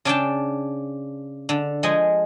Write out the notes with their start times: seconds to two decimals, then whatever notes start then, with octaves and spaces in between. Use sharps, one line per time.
0.05 C#3 D4 G5 A5
1.49 D3
1.83 F3 G#3 D#5 G#5